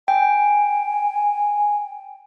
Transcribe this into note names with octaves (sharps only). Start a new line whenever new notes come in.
G5 G#5